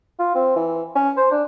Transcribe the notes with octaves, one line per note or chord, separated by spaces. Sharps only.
F4
C4
E3
C#4
C5
D4